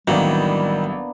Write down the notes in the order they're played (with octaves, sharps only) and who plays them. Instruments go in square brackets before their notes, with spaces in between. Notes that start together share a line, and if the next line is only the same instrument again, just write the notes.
[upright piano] A1 F#3 E4 [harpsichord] D#3 [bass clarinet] G3 [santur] A#3 B3 D4